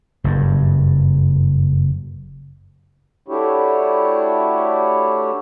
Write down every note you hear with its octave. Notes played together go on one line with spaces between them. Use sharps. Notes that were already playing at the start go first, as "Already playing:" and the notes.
F#1 G2
A3 D4 E4 F#4 G4 C#5